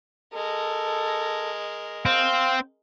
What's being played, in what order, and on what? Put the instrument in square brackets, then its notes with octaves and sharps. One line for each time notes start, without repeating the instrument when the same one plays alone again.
[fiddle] G#3 A#4 [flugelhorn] A4
[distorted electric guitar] C4 [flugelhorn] F5